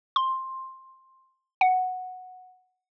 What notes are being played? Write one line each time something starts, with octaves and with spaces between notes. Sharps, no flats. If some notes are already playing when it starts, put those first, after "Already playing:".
C6
F#5